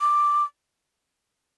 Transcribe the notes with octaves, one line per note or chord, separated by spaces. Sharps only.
D6